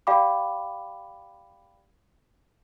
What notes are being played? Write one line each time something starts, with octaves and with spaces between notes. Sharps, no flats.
G4 D5 F5 G5 B5 D6